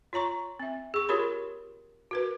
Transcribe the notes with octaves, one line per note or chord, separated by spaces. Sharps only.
F4 C#5 A#5 C#6
C4 E5
G#4 C#6
F4 G4 A#4 C#5 B5
F#4 A#4 B4